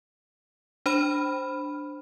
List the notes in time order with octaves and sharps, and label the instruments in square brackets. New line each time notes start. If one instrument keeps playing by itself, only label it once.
[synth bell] D4 C5 B5 F6